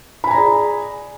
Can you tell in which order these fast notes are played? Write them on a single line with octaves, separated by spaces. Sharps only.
B5 G#5 A#5 D5 G#4